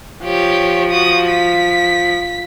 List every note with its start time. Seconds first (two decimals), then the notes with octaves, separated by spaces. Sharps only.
0.24 F3 G4 C#5
0.91 F#4 D#6
1.30 B6